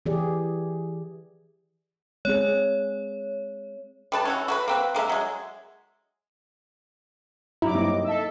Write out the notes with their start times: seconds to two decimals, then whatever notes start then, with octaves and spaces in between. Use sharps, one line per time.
0.06 E3 G4 G#4 D5
2.25 G#3 C4 G#4 C#5
4.12 G3 B4 A5
4.25 C#4 E4 F#4
4.48 F#4 A#4 B4
4.68 A#3 C4 B4
4.94 G#3 A#3 A#4 E5
5.09 F#3 G#3
7.62 G2 F#3 E4 A#5 D6
7.75 A#3 C4 D#4 D#5
8.04 A4 E5 E6